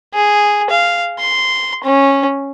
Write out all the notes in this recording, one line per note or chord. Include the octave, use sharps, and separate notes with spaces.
G#4
F5
C6
C#4